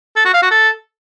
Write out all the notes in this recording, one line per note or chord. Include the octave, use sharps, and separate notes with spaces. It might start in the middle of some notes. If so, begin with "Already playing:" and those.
A4
F#4
F5
F#4
A4